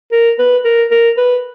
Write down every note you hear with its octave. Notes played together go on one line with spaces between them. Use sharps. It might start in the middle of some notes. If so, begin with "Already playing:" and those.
A#4
B4
A#4
A#4
B4